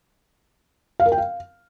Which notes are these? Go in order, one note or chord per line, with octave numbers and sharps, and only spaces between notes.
F5
A#4
G5
F5